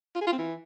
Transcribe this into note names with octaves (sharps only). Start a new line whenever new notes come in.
F4
G#4
F4
C4
E3